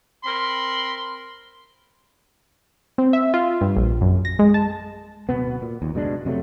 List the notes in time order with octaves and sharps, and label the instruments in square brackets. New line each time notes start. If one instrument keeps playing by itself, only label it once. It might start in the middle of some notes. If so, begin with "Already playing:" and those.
[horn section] C4 A#4 B5 C6
[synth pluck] C4
E5
F4
G2
A#1
F#2
A#6
G#3
A5
[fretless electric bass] D1 B2 B3
A#2
D#2
F#1 B2 G#3 D4
F2 C3 F#3 A3